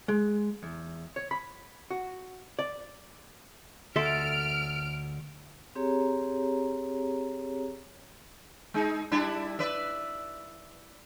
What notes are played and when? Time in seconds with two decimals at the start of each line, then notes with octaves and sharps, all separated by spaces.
0.08 G#3
0.63 E2
1.16 C#5
1.31 B5
1.90 F#4
2.59 D5
3.96 D2 A4 E5 C6 F6 D7
5.75 C4 G4 G#4 C#5 A#5
8.74 G#3 D#4
9.11 G3 D4 E4
9.59 B4 D5 E5